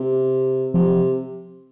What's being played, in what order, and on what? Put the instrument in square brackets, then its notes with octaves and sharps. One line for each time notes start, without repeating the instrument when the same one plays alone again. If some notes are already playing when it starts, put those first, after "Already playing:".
Already playing: [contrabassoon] C3
[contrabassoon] C3 [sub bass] F3